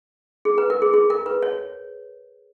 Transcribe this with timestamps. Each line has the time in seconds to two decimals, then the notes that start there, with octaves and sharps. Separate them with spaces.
0.45 G#4
0.58 B4
0.70 A#4
0.82 G#4
0.93 G#4
1.10 A#4
1.26 B4
1.43 C#5